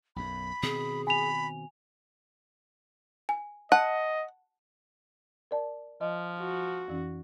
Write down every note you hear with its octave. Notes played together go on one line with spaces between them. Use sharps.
B1 F#2 B5
B2 D#3 C4 G#4
G#5 B5 F7
G#5
D#5 F#5 A5
A#4 D5 A5
F3 D#5
F#4
F2 E3 C#4